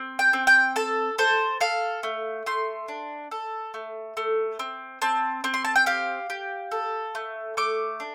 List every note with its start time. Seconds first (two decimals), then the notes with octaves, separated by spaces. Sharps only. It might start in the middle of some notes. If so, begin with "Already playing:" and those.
Already playing: C4
0.19 G5
0.33 C4
0.47 G5
0.76 A4 A5
1.18 A4 C5
1.61 A4 F5
2.03 A3
2.46 A3 C6
2.88 D4
3.31 A4
3.74 A3
4.17 A3
4.59 C4
5.02 C4 A5
5.44 C4
5.54 C6
5.65 A5
5.76 G5
5.86 G4 F5
6.30 G4
6.71 A4
7.15 A3
7.57 A3 D6
8.00 D4